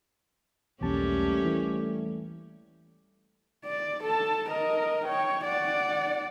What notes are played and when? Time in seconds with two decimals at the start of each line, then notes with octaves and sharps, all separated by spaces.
0.81 B1 E2 G3 A3 A#3 C#4 G4 A5
1.45 E3
3.65 D5
4.04 A4 A5
4.50 A#4 D#5
5.05 C#5 G5
5.45 D5 F#5